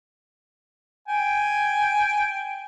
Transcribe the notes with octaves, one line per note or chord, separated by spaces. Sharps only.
G5 G#5